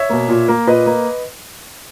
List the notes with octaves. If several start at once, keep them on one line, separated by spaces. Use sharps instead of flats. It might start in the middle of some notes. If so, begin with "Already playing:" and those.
Already playing: C#5 E5
B2 A#3
A#2
A#3
A#2 B4 D#5
A#3